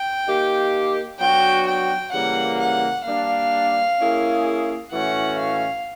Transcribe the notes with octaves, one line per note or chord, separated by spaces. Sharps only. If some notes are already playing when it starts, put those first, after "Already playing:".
Already playing: G5
A#3 D#4 G4
F#3 B3 D4 F#4 G5
G5
C#3 E3 G3 A#3 F#5
F#5
G3 A#3 D4 F5
A#3 C#4 E4 G#4
A2 E3 A3 C#4 F#4 F#5
F5